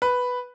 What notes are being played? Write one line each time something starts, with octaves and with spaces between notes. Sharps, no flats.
B4